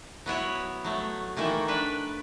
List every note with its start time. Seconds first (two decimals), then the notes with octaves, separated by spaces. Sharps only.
0.26 F#3 B3 E4 C#5
0.85 F#3 A3
1.37 D#3 E3 A3 A#3
1.68 D4 B4